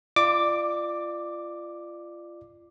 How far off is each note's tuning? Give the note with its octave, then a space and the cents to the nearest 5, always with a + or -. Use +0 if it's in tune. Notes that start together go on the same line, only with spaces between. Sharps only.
F4 -25 D5 +25 D6 +0